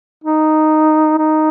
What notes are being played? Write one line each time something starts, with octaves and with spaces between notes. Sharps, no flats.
D#4
D#4